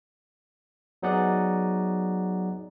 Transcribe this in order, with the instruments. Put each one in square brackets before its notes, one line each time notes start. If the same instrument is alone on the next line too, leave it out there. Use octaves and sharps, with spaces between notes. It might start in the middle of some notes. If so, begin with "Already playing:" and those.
[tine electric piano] F#3 B3 D#4 G#4 D5 F#5